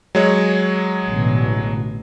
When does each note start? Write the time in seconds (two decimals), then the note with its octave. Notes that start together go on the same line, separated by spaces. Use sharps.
0.15 F#3 G#3 C#5
1.07 A1 B2 D3